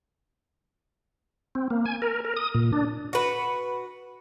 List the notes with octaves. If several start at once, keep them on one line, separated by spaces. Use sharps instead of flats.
C4
A#3
G#5
A#4
A#4
D#6
A#2
D4
F#4 B4